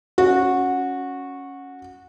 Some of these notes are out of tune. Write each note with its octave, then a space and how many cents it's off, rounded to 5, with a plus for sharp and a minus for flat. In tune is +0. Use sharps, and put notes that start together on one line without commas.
C#4 +0 F#4 -15